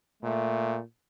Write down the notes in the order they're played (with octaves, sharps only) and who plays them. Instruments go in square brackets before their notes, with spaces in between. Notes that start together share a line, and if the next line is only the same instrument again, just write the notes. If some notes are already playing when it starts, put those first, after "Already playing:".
[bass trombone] A#2 [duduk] A3